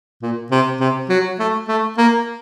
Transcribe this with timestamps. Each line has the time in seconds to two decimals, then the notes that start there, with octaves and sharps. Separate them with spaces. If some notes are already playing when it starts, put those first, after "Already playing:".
0.22 A#2
0.51 C3
0.80 C3
1.10 F#3
1.39 A3
1.68 A3
1.98 A#3